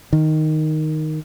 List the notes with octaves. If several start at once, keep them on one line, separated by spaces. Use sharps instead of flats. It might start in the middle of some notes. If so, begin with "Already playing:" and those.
D#3